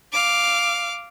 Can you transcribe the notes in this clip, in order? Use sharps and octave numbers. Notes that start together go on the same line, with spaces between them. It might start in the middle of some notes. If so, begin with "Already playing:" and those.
F5 D6